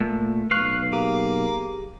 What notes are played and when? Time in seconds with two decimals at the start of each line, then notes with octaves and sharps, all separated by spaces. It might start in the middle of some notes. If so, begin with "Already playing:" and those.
0.01 A#2 A3
0.51 B1 B4 F5 C#6 F#6
0.93 A#3 G4 G#4